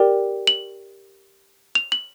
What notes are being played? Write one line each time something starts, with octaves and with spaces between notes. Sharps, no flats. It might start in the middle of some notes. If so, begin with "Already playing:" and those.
Already playing: G4 A#4 D5 G5
F#7
F7
F#7